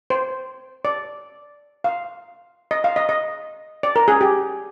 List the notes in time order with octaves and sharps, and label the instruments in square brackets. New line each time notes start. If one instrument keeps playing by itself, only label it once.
[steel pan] C5
D5
F5
D#5
F5
D#5
D#5
D5
A#4
G#4
G4